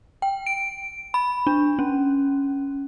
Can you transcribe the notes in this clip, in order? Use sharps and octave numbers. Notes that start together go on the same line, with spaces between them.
G5
D7
B5
D4
C#4